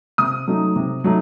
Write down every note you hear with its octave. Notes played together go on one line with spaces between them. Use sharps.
C3 D#6
F#3 A3 D#4
C3
F#3 A3 D#4